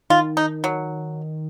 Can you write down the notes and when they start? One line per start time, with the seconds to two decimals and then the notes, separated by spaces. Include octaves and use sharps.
0.10 D#3 F4
0.37 D#4
0.64 F#3